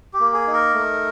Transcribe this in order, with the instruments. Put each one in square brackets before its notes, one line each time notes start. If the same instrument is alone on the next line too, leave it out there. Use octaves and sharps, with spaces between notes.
[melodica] G4
A#3
G#4
D#4
A#4
A3